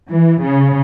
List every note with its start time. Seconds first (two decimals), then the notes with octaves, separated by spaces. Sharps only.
0.08 E3
0.41 C#3